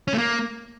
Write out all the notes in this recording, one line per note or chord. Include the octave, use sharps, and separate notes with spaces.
C#4
A3
A#3